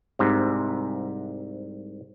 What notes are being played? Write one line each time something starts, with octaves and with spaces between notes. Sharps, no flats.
C2 G#2 C3